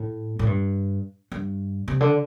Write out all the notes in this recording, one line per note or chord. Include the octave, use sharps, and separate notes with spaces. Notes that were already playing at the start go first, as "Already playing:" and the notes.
Already playing: A2
A2
G2
G2
C3
D3